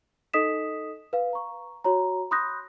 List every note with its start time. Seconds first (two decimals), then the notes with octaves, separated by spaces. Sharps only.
0.34 D#4 A4 D#5 D#6 B6 E7
1.13 B4 F5
1.33 A#5 C#6
1.84 F#4 C#5 A#5
2.31 B5 C6 D#6 F#6 G6 A#6